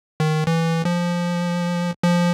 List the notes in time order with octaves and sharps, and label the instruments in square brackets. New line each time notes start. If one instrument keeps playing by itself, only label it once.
[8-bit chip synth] D#3
E3
F3
F3